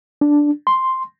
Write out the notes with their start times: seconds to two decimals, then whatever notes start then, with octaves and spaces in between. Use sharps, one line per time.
0.21 D4
0.67 C6